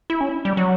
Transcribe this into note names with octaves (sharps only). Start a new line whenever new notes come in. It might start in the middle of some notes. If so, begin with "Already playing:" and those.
E4
C#4
G3
F#3